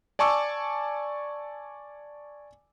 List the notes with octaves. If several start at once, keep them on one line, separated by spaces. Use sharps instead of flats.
D5 G#5 A5 C#6 D6 E6